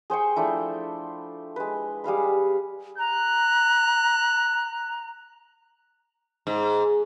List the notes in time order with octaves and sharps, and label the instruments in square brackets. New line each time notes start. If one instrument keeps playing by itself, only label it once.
[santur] G#4 C5 G5 C#6
F3 A3 D4 E4
G#3 B4
G3 G#4 F5 B5
[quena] A#5 [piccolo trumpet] F#6
[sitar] G#2